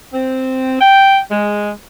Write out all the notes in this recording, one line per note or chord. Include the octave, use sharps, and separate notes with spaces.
C4
G5
G#3